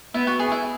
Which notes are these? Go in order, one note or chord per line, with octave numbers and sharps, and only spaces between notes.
B3 E4
F#4
G#4
E4